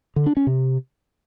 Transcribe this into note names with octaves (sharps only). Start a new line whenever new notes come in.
D3
D4
C#4
C3